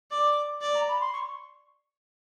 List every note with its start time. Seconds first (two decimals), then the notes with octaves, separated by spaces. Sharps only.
0.11 D5 D6
0.61 D5
0.74 A#5
0.87 B5
1.00 C6
1.12 C#6